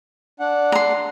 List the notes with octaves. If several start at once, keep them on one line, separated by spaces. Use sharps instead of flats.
D4 F#5
A#5 C6